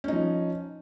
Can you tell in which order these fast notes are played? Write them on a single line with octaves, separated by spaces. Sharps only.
C#4 D#4 F3